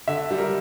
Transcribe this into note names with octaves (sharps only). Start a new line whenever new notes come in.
D3 E5
G3
A#4